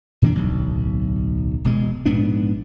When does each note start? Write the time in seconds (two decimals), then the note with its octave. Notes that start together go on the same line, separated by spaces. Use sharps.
0.22 A2 E3 C4 D4
0.35 D1 B1
1.64 E1 B2 G#3
2.06 A#1 G#2 B3 D4